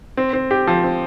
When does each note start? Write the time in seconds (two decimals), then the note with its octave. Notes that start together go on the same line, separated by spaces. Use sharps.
0.17 C4
0.33 C4
0.51 G4
0.67 F3
0.84 C4